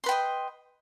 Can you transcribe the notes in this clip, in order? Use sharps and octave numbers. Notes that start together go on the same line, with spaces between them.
B4 D#5 G5 C6